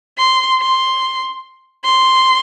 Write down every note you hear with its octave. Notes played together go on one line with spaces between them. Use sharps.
C6
C6
C6